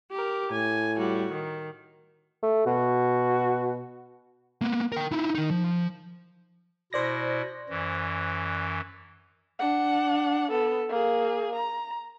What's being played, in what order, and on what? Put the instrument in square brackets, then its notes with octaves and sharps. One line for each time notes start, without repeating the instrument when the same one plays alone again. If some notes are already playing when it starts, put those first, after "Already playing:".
[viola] G4 A#4
[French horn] A2 [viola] G#5
[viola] G3 F#4
D#3
[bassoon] A3
[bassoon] B2 [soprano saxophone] F#4
[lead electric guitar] A#3 B3
A#4 G5
D#4 E4
D#3 D#4
F3
[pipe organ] B2 E4 [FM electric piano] C5 D5 A#6
[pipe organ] F#2 E3
[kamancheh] D4 F#5
B3 A4
A#3 G#4
A#5